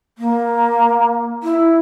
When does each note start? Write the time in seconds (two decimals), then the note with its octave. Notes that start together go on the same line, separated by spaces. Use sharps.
0.18 A#3
1.43 E4